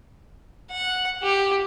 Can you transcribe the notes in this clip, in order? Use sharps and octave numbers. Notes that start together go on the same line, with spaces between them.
F#5
G4